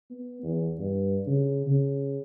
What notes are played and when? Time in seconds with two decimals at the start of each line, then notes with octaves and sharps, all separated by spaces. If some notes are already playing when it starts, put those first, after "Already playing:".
0.10 B3
0.43 E2
0.79 G2
1.27 C#3
1.67 C#3